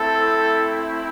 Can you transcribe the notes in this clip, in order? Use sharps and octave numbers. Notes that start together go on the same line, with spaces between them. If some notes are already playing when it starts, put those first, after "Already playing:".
Already playing: A3 C4 E4 A4